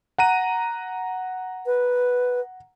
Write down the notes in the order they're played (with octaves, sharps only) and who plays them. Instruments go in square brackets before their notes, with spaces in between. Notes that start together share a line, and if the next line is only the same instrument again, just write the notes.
[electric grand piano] F#5 A#5 D#7
[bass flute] B4